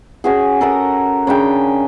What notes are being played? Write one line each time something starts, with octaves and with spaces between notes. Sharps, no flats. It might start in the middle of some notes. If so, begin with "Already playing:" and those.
C#4 F#4 G#4
A4 A#4 F#5 A#5
C#3 D4 G#4 G5